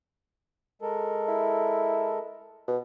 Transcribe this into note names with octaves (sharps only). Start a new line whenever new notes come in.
G#3 A4 A#4
E4
B2